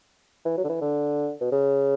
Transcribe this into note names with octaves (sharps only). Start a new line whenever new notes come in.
E3
F#3
D3
E3
D3
B2
C#3